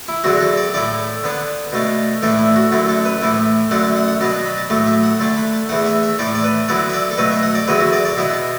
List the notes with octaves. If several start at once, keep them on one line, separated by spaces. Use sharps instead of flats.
E4
E2 D3 F#3 D4 F#4
A4
D5
A2 A3 E4 D5
D3 B3 D4
B2 A3 D4
A2 E3 A3 D4 E5
E4
F#4
F#2 D3 A3 E4
A4
B4
A2 E3 A3 E4
F#2 D3 A3 D4 F#5
A5
F#5
F#5
B2 F#3 B3 D4 A5
A5
B5
A5
A2 F#3 A3 A5
E5
F#5
D3 A3 D4 A5
B5
A5
E2 E3 A3 F#5
E5
E5
A2 E3 A3 D5
D5
B4
D3 F#3 B3 E4 D5
E5
D5
A4
B2 F#3 A3 B4
E5
F#5
D5
E2 D3 F#3 B3 E4 B4
F#4
D5
D5
B2 B3 E4 E5
A5